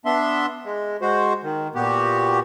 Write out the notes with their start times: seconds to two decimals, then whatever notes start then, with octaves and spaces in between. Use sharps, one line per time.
0.05 B3 D4 E5 C6
0.65 G#3
1.02 G#3 F#4 C5
1.43 D#3
1.75 A#2 B3 F#4 G4